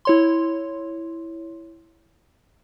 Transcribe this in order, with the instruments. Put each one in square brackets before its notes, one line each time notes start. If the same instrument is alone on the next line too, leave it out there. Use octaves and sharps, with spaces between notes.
[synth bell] E4 C#5 C6